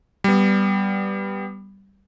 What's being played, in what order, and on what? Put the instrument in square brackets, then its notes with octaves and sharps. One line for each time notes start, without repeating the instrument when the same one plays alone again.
[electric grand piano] G3 B3